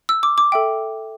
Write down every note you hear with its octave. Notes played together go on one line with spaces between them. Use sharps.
E6
D6
D6
A4 E5 G5